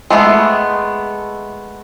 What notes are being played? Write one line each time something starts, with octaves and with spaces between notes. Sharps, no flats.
G#3 A3 B3